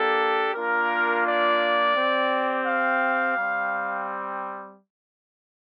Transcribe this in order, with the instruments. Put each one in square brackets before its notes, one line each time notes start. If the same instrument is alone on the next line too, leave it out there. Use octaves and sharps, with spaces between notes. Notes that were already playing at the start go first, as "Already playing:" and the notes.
Already playing: [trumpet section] A#3 D4 G4 A4
A#3 D4 F4 A#4
D5
C4 G4
F5
G3 C4